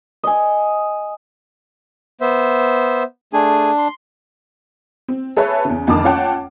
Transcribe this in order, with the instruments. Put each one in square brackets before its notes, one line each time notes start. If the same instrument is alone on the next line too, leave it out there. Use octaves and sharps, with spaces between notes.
[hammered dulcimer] D#5 G#5
[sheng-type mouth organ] B3 C5 E5
[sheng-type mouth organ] A3 G#4 G#5 [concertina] D4
[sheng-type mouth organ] C6
[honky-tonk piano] C4
G#4 A4 B4 C#5 E5 A5
E2 C#3
F1 F2 D3 D#3 A5 D6
C#4 F4 C#5 F#5 G5 A5